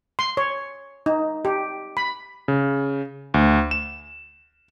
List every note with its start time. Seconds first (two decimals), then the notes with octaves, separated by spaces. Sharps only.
0.19 C6
0.37 C#5
1.06 D#4
1.45 G4
1.97 B5
2.48 C#3
3.34 D2
3.71 E7